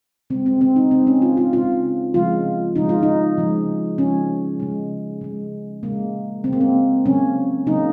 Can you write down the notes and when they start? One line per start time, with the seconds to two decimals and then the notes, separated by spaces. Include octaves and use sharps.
0.30 C#3 C4
0.34 G#3
0.46 C4
0.61 C4
0.76 D#4
0.91 C#3 G#3 C4
1.07 C#4
1.22 F4
1.37 F4
1.53 C#3 G#3 F4
2.14 C#3 F3 G#3 F4
2.76 C#3 F3 G#3 D#4
2.89 F4
3.03 D#4
3.37 C#3 F3 G#3
3.98 C#3 F3 G#3 C#4
4.60 C#3 G#3
5.21 C#3 G#3
5.83 C#3 G#3 A#3
6.44 C#3 G#3 C4
6.53 A#3
6.61 C4
7.06 C#3 F#3 A#3 C#4
7.67 C#3 F#3 A#3 D#4